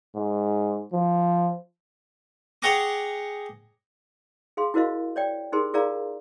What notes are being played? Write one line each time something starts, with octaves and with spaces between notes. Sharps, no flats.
G#2
F3
G#4 C#5 F#5 G5 A#5 D6
G#4 F5 C6
E4 F#4 A#4 C5 D#5 F5
C#5 D5 G5
D#4 G4 G#4 A#4 C5 C6
F4 G#4 A#4 D5 F5 A#5